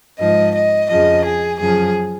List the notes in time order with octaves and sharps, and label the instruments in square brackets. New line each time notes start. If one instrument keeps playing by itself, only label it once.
[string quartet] G#2 F3 D#5
D#5
F2 C#3 F3 D#5
G#4
F#2 C#3 F3 G#4